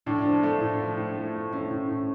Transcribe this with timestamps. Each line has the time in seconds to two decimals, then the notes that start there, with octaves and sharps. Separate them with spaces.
0.06 A2 D4
0.26 F3
0.43 A3
0.61 A2
0.79 F3
0.97 A2
1.16 A3
1.34 A3
1.53 A3 C#4
1.71 A2
1.89 A2